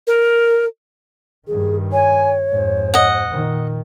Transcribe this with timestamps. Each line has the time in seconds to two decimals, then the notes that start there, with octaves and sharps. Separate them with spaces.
0.07 A#4
1.48 G2 D#3 G#4
1.92 C#5 G#5
2.50 F2 G#2 C5
2.94 D#5 F#5
3.30 A#2 D#3